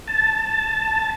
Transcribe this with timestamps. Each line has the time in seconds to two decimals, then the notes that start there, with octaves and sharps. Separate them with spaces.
0.08 A5